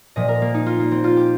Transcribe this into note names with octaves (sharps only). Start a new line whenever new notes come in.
A#2 F3 D#5
A#4
A#3
D#4
F4
A#3
C4
F4
G4